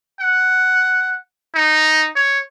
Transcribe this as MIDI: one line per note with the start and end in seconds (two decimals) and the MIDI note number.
0.20 1.17 78
1.55 2.09 63
2.16 2.39 73